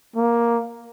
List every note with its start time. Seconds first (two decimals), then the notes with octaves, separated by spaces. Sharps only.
0.16 A#3